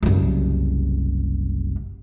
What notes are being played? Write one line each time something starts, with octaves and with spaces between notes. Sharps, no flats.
F#1 C2